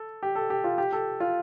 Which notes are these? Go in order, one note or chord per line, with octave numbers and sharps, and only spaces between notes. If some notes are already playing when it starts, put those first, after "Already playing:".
Already playing: A4
G4
A4
G4
F4
G4
A4
F4